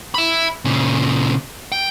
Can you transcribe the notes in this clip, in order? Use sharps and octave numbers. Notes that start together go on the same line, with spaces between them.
E5 B5
A#2 C#3
G5